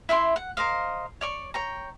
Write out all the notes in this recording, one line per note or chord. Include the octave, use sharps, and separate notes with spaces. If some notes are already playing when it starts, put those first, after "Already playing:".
E4 E5 F#5 C6
F#5
A#4 C5 D#5 F5
C#5 D5 C#6
C#5 G5 A#5